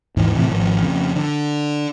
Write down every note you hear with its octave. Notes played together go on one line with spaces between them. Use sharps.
D#2 G#2 E3
F2 A2 C3 E3
G#1 F3
F2 C#3
D3